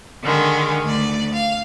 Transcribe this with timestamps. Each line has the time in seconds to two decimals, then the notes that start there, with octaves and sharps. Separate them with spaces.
0.23 D3 D#3 G#3 D#4
0.86 D2 D5
1.33 F5